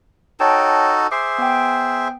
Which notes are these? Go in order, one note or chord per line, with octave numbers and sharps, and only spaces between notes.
D#4 F#4 A4 C#5 G5 A5
G#4 C5 E5 D6 C7
B3 G5